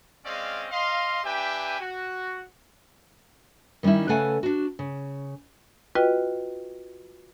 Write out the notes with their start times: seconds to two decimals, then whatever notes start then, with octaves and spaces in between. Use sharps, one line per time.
0.25 G#3 C4 C#4 D5 D#5 F5
0.72 D#5 F5 C6
1.24 D4 G4 B4 E5 G5 G#5
1.80 F#4
3.83 D#3 G3 C#4 D#4 E4
4.09 C#3 A3 A4 B4 F#5 G#5
4.43 D4 F#4
4.79 C#3
5.95 F4 F#4 B4 D#5 G5